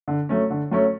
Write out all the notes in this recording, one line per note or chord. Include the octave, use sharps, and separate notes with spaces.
D3
F#3 A3 C#4
D3
F#3 A3 C#4